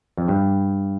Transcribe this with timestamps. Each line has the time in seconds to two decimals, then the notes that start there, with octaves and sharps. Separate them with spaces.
0.17 F2
0.28 G2